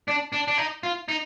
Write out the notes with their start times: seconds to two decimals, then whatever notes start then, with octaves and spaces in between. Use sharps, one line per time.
0.08 D4
0.33 D4
0.48 D4
0.58 D#4
0.83 F4
1.08 D#4